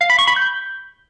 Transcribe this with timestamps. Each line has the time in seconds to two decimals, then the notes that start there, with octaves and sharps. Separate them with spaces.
0.01 F5
0.10 B5
0.19 C#6
0.27 B5
0.36 G6